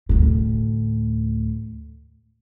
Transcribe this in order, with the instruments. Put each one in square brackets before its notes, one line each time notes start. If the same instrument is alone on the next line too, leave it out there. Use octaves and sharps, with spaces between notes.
[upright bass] D2 A2